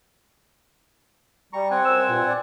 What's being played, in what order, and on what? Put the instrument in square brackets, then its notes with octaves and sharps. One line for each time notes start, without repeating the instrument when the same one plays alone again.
[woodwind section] G3 [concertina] A#5 C#6
[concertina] C4 F#5 G#5
[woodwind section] F#2 C5 E6
G2 A#2
D5